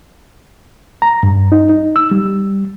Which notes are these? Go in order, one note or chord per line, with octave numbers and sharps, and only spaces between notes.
A#5
G2
D#4
D#4
E6
G3